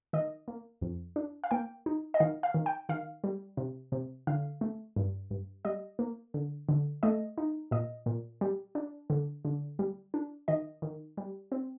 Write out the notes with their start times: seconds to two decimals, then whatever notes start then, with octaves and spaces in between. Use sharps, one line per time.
0.13 D#3 D#5
0.48 A#3
0.81 F2
1.16 D4
1.44 F5
1.51 A#3 G5
1.86 D#4
2.14 D#5
2.20 D#3 F5
2.43 F5
2.54 D#3
2.66 G5
2.89 D#3 F5
3.24 G3
3.57 C3
3.92 C3
4.27 D3 F5
4.61 A3
4.96 G2
5.31 G2
5.65 G3 D#5
5.99 A#3
6.34 D3
6.69 D3
7.03 A3 D#5
7.38 D#4
7.71 A#2 D#5
8.06 A#2
8.41 G3
8.75 D4
9.10 D3
9.45 D3
9.79 G3
10.14 D4
10.48 D#3 D#5
10.82 D#3
11.17 G3
11.52 C4